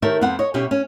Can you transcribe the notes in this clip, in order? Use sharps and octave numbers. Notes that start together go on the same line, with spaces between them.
D#3 G4 A4 A#4 C#5 E5
F2 B3 C4 F#5
C#5 D#5
B2 C#4 G4 E5
C#4